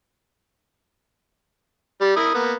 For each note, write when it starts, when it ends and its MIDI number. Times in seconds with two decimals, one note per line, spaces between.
2.01 2.15 55
2.16 2.33 64
2.16 2.33 70
2.16 2.33 87
2.34 2.54 58
2.34 2.54 59